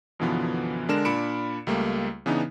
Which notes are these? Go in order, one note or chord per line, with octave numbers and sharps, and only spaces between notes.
F#2 B2 D3 E3 F3 B3
D3 G#3 D4 A#4 F6 E7
A#2 D4 B5 C#7 D7 E7
C#2 G3 A3 A#3
C#3 E3 B3 D4 D#4